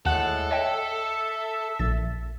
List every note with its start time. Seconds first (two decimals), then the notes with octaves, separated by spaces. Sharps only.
0.06 D#2 A2 G#3 A4 F#5
0.51 C#5 D#5 E5 G5
1.79 A#1 A6